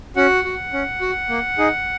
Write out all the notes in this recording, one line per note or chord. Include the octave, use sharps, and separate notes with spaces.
C#4 F#4 F#5
F#4
C#4
F#4
A#3
D#4 G#4